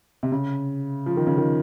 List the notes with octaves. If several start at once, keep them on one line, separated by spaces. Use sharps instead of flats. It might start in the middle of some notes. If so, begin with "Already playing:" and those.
C3
C#3
F3
D#3
C#3
D#3